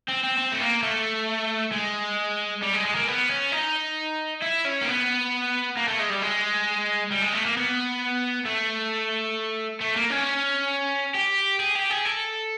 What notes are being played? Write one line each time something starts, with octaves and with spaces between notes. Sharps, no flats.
C4
C4
C4
A3
A#3
A3
G#3
G3
G#3
G#3
A#3
B3
C#4
D#4
E4
C#4
A#3
B3
A#3
A3
G#3
G3
G#3
G3
G#3
A3
A#3
B3
A3
A3
A#3
C#4
G4
G#4
G4
G#4
A4